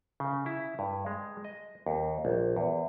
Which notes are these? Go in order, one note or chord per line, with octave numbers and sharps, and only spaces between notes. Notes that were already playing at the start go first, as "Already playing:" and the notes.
C#3
E4
G2
G#3
D#5
D#2
A#1
E2